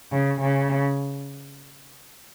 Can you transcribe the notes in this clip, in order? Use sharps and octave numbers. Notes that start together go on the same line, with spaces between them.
C#3
C#3